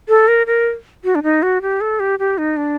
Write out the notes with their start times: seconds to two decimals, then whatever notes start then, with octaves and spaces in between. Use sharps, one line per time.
0.09 A4
0.28 A#4
0.47 A#4
1.04 F#4
1.15 D4
1.23 D#4
1.43 F#4
1.62 G4
1.81 A4
2.00 G4
2.19 G4
2.38 D#4
2.57 D4